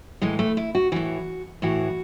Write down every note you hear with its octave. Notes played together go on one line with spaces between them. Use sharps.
A2 E3 G#3
A3
E4
F#4
A2 E3 F#4
A2 E3 F#4